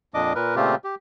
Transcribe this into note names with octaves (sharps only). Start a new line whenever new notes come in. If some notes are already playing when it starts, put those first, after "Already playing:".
F2 A#2 D4 D#5 D6
A#2 A#4 B4
A#2 C#3 A3 C4 F4 G4
G4